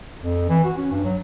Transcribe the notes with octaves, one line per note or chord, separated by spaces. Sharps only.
F2
E3
F#4
C#4
G2
F#3